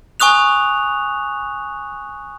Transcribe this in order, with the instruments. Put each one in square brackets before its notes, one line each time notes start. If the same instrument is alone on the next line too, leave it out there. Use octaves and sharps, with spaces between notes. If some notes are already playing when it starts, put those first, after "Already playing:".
[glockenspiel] G#5 C#6 D#6 F#6 F7